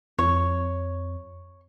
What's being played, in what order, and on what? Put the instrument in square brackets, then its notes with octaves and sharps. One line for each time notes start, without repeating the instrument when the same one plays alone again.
[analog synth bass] F2 [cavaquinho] C#5